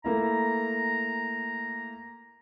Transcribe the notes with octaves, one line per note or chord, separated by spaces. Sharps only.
A3 A#3 E4 A#5